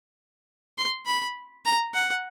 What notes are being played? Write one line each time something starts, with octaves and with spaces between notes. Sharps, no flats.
C6
B5
A#5
F#5